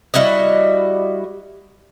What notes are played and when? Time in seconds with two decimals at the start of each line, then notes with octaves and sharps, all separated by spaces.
0.14 G3 E4 F#4 D#5